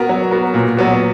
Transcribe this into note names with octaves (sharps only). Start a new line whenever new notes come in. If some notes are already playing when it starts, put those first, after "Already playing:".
Already playing: B3 F#4 A#4
F#3
B3 F#4 A#4
A#2
F#3 B3 F#4